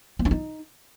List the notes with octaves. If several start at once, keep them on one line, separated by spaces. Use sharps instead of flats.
A#3
C#4
D#4